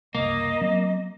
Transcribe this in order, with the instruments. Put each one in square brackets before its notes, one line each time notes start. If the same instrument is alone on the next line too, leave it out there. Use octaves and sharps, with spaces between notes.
[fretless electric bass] F#1 C2 [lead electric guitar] A#3 [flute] D#5
[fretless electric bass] F#3 B3 C4